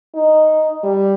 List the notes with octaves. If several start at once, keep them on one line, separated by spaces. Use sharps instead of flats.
D#4
G3